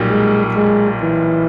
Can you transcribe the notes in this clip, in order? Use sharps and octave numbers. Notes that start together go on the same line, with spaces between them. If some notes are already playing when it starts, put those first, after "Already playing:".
Already playing: B1 A#2 G3
G#3
G#3
E3